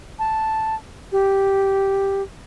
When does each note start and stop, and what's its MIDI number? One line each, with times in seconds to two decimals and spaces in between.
0.19 0.75 81
1.12 2.23 67